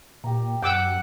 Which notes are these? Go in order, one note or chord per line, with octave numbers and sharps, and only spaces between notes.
A#2 G4 A#5
F#2 F#5 G5 D6 E6